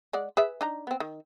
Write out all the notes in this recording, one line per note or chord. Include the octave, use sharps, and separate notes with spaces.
G#3 D5 F#5
G#4 B4 E5
D4 D#4 A#5
B3 C4
D#3